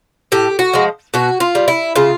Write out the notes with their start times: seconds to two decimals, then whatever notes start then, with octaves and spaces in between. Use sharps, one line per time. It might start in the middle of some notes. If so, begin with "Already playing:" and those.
0.32 A2 G4
0.59 F#4
0.73 F3 G#3
1.14 B2 F#4
1.40 F4
1.55 G3
1.68 E4
1.96 C#3 F4